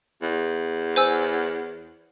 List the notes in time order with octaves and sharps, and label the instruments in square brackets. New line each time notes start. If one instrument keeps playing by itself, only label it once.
[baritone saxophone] E2
[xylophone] C5 G#5 E6